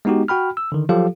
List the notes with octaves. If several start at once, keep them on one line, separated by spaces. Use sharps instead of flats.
G#3 B3 D#4 F#4 G4
F#4 G5 B5 F6
E6
D3 D#3
F3 F#3 F4 G4 A4 F5